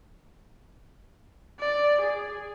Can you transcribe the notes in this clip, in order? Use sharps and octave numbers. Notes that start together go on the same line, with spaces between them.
D5
G#4